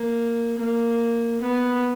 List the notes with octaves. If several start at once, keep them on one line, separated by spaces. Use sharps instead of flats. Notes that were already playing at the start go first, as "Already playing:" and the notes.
Already playing: A#3
A#3
B3